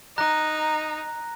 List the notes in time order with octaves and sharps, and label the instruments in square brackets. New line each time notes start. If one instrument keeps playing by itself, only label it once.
[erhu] D#4 [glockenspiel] A#5 F#6 A#6